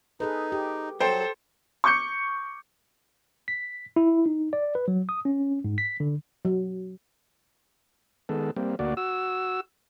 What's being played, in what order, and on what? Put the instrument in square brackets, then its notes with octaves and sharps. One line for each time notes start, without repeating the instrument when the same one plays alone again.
[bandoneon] D#4 [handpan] G#4 A4 B4
[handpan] G4
[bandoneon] F#3 [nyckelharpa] A4 [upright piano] C5 G5
[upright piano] C#6 D6 G6 C#7
[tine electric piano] B6
E4
D#4
D5
B4
F#3
D#6
C#4
G#2
B6
D3
[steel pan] F#3
[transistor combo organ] D#3 G#3 B3 A4
G3 A#3 C4
D2 A#3 F#4 D5
F#4 E6